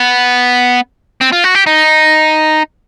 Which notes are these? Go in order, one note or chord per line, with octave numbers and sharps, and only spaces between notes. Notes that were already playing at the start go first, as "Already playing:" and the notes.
Already playing: B3
C4
F4
F#4
G4
D#4